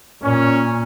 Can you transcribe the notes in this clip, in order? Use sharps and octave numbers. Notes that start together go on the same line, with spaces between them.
A#2 C#4